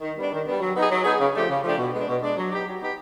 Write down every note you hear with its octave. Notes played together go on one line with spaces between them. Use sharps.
D#3
G3 B3 D4
D#3
G3 B3 D4
F#3
B3 D#4 G#4
F#3
B3 D#4 G#4
C#3
F3 A3 D4 G4
C#3
F3 A3 D4 G4
B2
G#3 B3 D4
B2
G#3 B3 D4
F#3
B3 D#4 G4
F#3
B3 D#4 G4